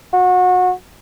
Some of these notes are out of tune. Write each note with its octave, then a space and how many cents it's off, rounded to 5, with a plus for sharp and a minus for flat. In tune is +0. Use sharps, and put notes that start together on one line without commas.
F#4 -25